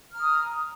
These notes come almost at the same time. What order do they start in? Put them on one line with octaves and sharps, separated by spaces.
F6 A#5 D#6